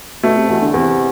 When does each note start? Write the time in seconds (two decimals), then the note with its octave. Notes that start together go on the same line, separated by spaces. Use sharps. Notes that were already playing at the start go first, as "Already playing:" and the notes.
0.23 B2 A3
0.36 C3
0.49 E2 B2
0.61 D3
0.74 E2 C3